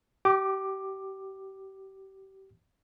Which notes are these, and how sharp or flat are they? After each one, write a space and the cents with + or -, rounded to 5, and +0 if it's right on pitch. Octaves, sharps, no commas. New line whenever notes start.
G4 -30 D6 +10